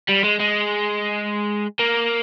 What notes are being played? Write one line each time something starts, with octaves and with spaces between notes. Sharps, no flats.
G3
G#3
G#3
A#3